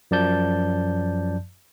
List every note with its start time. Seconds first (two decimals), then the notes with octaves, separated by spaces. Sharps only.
0.11 F#2 F3 D5 A5 G6